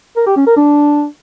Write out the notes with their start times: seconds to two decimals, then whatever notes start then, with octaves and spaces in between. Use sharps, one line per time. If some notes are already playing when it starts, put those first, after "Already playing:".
0.16 A#4
0.26 G4
0.36 C#4
0.47 A#4
0.57 D4